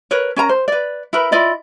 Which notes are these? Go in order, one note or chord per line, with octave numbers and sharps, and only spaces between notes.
A#4 B4 C#5
C#4 A#4 A#5
C5
B4 D5
E4 A#4 B4
E4 F4 D5 D#5